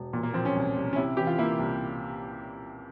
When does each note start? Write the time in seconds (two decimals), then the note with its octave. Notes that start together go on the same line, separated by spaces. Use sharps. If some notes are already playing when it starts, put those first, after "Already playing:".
Already playing: E1
0.13 A#2
0.23 A#3
0.34 F3 C4
0.45 C#4
0.56 C2
0.76 C2
0.93 C#4
0.96 C3 E4
1.17 E3 G4
1.27 F4
1.38 A#3 E4
1.59 C2